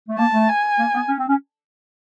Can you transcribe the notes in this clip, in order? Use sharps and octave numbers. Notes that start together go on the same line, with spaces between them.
A3
A#3 A5
A3
G#5
A#3
B3
C#4
C4
C#4